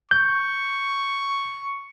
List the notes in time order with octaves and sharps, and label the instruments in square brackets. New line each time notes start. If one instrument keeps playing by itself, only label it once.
[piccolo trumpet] C#6 [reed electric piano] G6